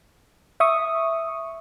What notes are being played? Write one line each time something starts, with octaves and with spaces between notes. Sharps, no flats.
E5 C#6 D#6